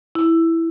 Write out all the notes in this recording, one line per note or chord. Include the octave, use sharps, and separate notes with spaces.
E4